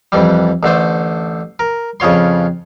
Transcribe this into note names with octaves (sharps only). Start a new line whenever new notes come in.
F2 E3 G3
A1 D3 A3 C5
A#4
F2 C#3 F4 C#5 C6